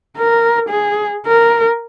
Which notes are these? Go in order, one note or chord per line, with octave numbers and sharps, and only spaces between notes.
A#4
G#4
A#4